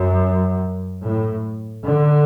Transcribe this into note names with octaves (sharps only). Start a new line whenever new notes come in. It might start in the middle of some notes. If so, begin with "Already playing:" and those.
Already playing: F#2
A2
D3